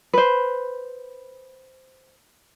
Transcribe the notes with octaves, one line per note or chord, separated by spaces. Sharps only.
B4 C5